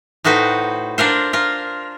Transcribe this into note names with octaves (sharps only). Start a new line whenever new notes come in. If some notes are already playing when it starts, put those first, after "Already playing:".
A2 D#4 F#4 B4 C5
D4 F4 A#4 C5
F4 A#4